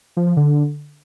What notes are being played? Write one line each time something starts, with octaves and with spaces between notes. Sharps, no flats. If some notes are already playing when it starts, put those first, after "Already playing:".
F3
F3
D3